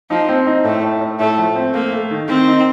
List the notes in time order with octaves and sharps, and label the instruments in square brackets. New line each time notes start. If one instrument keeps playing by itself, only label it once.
[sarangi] F3 [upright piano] D#4
[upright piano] C4
D#4
[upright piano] A2 [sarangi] A3
[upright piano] A2
A2
[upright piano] A2 [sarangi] A3
[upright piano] F3
C4
[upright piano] A3 [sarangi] A#3
[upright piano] A3
D#3
[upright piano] D#3 [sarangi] C4
[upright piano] D#4